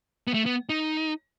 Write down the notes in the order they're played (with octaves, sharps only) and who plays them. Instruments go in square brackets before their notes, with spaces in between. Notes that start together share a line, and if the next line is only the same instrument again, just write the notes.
[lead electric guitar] B3
A3
B3
D#4